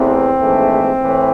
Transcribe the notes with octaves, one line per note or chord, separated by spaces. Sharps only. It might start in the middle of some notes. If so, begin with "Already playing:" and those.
Already playing: E2 C3 E3 A3 C4
A#1 G#2 E3 A3
A2 E3